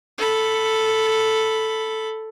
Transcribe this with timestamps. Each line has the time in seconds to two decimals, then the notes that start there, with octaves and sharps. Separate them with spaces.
0.18 A4 B5